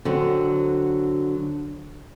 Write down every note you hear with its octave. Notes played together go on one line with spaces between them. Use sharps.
D3 F#3 C4